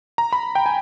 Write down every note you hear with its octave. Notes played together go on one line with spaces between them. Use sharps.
A#5
B5
G5
G#5